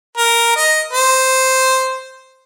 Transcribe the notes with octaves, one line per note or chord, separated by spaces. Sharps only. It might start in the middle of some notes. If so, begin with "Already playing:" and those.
A#4
D#5
C5